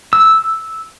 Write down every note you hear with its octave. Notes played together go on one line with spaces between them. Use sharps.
E6